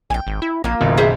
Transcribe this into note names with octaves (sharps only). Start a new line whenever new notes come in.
A#1 G5 G#5
G#1
E4
A#1 A#3 F4
F#1 B1 D#3
G#4 C5 E5